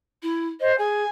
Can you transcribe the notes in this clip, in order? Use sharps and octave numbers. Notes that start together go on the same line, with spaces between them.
E4
C5 D#5
G#4 G#5